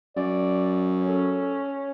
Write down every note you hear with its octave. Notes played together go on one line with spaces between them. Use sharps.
F#2 D5
C#4 A4